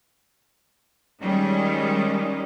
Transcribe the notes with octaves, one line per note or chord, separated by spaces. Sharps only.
D#3 G3 G#3 C#4